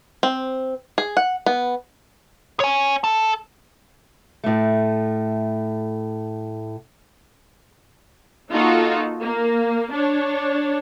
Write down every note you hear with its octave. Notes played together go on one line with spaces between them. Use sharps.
C4
G#4
F#5
B3
C#5 G#5
A4 A5
A2 A3
A#3 D#4 F4 F#4 A4
A#3
D4 C#5